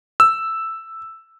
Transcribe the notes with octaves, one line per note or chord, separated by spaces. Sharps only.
E6